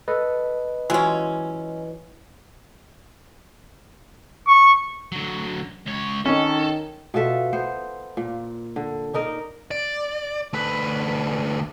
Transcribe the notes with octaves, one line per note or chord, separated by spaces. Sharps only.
A4 B4 D#5
E3 F#3 G#3 C#4 F4
C#6
D3 F#3
C#2 C#5
D#3 C#4 A4
B2 F4 A4 E5
B3 C5
A#2
D3
D4 D#4 A#4 D#5
D5
D2 B4